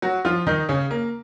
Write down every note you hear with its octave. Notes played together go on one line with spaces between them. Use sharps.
F#3 F#4
F3 F4
D#3 D#4
C#3 C#4
A#3